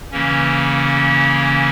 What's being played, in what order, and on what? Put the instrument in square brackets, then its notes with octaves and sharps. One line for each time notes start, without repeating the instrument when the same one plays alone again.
[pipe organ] C#3 E3 A#3 C#4